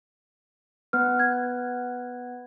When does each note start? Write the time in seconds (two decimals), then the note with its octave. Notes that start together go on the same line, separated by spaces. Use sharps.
0.93 B3 B4 F6
1.19 G#6